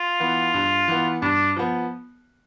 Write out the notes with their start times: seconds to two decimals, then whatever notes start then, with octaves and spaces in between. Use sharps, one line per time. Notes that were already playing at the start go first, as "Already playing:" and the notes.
Already playing: F4
0.20 E3 B3
0.54 G2
0.88 E3 B3
1.22 G2 D4
1.57 F3 B3